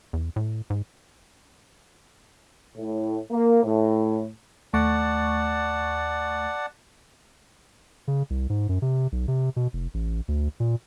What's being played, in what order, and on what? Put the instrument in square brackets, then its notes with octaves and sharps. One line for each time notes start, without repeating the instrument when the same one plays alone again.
[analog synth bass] E2
A2
G#2
[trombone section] A2
A#3
A2
[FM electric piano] D#2 A3 C#6 [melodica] D5 F#5 A5
[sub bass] C#3
C2
G#2
F#2
C3
B1
C3
B2
F1
A1
D2
A#2